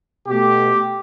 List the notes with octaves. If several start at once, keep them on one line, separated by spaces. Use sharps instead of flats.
B2 A3 G4